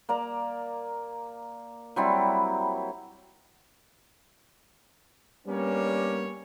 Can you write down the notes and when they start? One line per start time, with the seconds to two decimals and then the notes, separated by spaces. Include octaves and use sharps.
0.09 A#3 D5 A#5
1.96 F#3 G3 C4 E4
5.46 G3 A#3 B3 C#4 D4 C#5